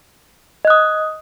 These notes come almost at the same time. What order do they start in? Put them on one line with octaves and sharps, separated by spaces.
D#5 F#6 D#6